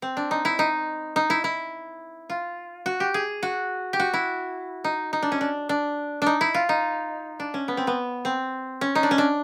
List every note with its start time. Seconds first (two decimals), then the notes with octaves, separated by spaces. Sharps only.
0.02 C4
0.17 D4
0.31 D#4
0.45 E4
0.59 D#4
1.16 D#4
1.30 E4
1.44 E4
2.30 F4
2.86 F#4
3.00 G4
3.14 G#4
3.43 F#4
3.93 G4
4.00 F#4
4.13 E4
4.84 D#4
5.13 D#4
5.22 D4
5.32 C#4
5.41 D4
5.69 D4
6.22 D4 D#4
6.41 E4
6.54 F4
6.69 D#4
7.40 D4
7.54 C#4
7.68 B3
7.77 C4
7.87 B3
8.25 C4
8.81 C#4
8.95 D#4
9.03 D4
9.11 C#4
9.18 D4